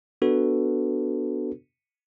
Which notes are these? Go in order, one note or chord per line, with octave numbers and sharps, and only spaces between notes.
B3 D4 F#4 A4 B4